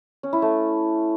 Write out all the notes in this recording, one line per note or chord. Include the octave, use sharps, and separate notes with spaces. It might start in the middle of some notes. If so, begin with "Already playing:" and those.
C#4
E4
A3